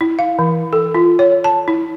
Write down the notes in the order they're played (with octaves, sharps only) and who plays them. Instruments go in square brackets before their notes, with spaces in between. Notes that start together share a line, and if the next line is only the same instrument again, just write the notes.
[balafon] E4
F5
E3
A4
F4
C#5
A5
E4